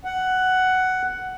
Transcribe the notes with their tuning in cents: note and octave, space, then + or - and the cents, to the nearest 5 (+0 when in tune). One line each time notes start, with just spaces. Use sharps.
F#5 +10